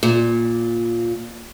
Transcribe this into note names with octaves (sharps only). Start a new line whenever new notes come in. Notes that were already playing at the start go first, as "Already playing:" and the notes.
A#2